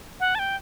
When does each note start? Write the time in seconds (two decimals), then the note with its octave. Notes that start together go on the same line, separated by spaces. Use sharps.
0.20 F#5
0.35 A5
0.39 G5